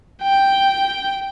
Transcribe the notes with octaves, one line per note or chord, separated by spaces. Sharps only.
G5